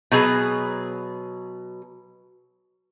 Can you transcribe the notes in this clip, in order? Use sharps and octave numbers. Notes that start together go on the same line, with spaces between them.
B2 F#3 G#4 B4